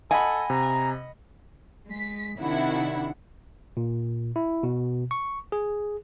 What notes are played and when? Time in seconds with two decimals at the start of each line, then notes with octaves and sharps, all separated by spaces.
0.11 A4 D#5 F#5 G#5 B5
0.50 C3 A#5
1.91 G#3 B6
2.39 C3 D#3 D4 E4 F#5
3.77 A#2
4.36 E4
4.63 B2
5.11 C#6
5.52 G#4